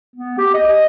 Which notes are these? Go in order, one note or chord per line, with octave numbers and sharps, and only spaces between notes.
B3
G4
D#5
D#5